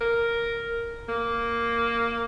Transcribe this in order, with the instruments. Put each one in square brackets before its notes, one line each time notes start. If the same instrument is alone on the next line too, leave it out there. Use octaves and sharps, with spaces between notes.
[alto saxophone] A#4
A#3